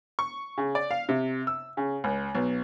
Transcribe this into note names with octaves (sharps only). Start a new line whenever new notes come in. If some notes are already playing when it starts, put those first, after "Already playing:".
C#6
C#3
D5
F5
C3
E6
C#3
C#2
B1